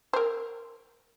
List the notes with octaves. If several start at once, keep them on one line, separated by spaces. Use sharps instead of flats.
A#4 C5